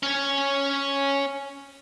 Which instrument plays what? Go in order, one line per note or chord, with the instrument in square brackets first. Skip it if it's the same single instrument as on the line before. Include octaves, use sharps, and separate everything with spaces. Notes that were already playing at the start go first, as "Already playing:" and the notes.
[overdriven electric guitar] C#4 C#5